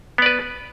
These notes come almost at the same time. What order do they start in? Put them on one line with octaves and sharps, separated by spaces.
B3 D5 B4